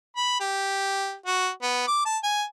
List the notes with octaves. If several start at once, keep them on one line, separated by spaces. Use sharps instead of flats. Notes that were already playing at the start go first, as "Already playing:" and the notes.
B5
G4
F#4
B3
D6
A5
G#5